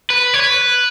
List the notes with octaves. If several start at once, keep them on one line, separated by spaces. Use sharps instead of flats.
B4
C#5
B4